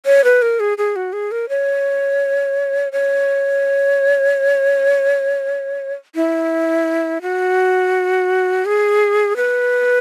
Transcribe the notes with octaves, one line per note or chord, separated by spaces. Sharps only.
C#5
B4
A#4
G#4
G#4
F#4
G#4
A#4
C#5
C#5
E4
F#4
G#4
B4